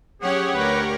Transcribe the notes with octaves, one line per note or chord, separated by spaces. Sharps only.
F#3 C#4 G4 G#4 C#5 F#5
D2 A#4 B4